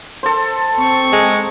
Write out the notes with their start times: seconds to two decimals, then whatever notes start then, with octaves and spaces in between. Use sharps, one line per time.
0.23 A4 C5
0.80 C4 C#6
1.13 G#3 A#5